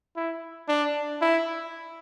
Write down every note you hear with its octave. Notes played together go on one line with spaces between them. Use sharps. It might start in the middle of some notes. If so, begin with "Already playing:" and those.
E4
D4
E4